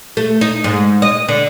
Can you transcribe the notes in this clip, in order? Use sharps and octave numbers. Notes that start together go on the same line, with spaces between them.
A3
D#4
G#2
D#5
D3